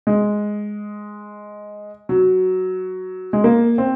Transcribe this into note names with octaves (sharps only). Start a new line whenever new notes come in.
G#3
F#3
G#3
A#3
C4